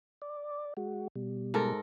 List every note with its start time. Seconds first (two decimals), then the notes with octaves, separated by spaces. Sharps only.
0.22 D5
0.77 G#3 F#4
1.15 B2 G3
1.54 G#2 A4 A#4